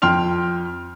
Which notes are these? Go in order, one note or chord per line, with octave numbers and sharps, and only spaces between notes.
F2 G5 C6 F6 F7